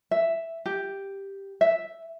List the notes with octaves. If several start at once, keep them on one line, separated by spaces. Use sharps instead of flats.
E5
G4
E5